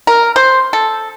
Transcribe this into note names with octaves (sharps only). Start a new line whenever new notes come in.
A#4
C5
A4